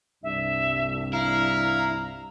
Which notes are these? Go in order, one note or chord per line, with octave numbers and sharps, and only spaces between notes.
C2 G2 D4 E5
E4 F5 A#5